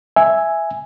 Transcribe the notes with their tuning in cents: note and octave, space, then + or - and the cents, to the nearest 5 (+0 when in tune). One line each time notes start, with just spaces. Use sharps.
E5 +0 G#5 +0